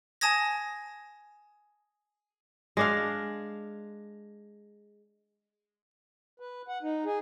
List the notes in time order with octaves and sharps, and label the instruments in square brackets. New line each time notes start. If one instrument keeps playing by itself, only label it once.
[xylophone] G#5 A5 D#6 G#6 A#6
[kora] G#3 D4 F5
[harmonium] B4
F#5
D#4
G#4